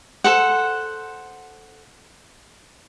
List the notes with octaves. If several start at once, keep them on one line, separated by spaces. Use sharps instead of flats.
A4 C5 F#5